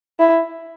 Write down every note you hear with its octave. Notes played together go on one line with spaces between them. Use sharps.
E4